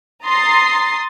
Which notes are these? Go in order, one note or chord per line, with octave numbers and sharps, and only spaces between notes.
A#5 C6 D#6 A6 C7